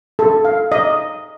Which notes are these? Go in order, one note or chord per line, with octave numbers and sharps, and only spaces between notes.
A4
F5
D#5